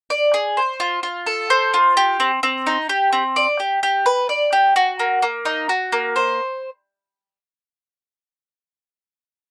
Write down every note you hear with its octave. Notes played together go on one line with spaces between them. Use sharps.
D5
G#4
C5
F4
F4
A4
C5
F4
G4
C4
C4
D#4
G4
C4
D5
G4
G4
B4
D5
G4
F#4
A#3
A#3
D#4
F#4
A#3
C5